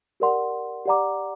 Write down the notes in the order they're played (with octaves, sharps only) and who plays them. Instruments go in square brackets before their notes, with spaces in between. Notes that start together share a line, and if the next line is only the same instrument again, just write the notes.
[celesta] G4 A#4 D5 F#5 C6
G4 D5 F#5 A#5 D6